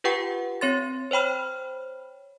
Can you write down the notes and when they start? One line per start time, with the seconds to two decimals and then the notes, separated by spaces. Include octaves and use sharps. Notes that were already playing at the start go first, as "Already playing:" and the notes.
0.04 F4 G4 B4 F#5 G5 C#6
0.61 C4 C#5 C6 A6
1.11 C5 C#5 G5 B5 F6